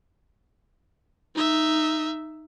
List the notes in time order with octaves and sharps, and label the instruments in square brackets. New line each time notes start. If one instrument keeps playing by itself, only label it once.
[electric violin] D#4 E5